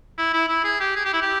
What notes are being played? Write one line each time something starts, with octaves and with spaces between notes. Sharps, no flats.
E4
E4
E4
G#4
G4
G#4
G4
E4
G4